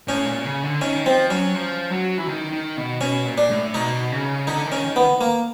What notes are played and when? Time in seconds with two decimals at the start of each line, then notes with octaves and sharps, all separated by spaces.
0.08 A2 C#4
0.26 A#2
0.44 C#3
0.63 D3
0.81 D#3 C#4
1.06 F3 C4
1.30 F#3 C#4
1.55 F3
1.91 F#3
2.18 E3
2.28 D#3
2.53 D#3
2.77 B2
3.01 B2 C#4
3.26 A#2
3.38 D4
3.51 A2
3.74 B2 D#4
4.12 C#3
4.47 D3 D#4
4.66 D#3
4.72 C#4
4.85 D#3
4.96 B3
5.21 A#3